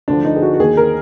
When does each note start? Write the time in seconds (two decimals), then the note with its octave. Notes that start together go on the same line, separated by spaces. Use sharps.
0.08 D2 D3 F3 D4
0.25 D#4
0.36 G#4
0.42 F#4
0.54 F#4
0.60 D#2 D#3 G#4
0.77 A#4